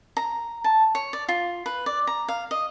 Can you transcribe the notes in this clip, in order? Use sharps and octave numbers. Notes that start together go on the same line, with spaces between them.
A#5
A5
C#5
D5
F4
B4
D5
A#5
F5
D#5